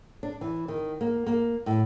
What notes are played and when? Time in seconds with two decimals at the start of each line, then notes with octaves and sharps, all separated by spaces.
0.23 D4
0.41 E3
0.68 D#3
1.01 A#3
1.26 A#3
1.66 A2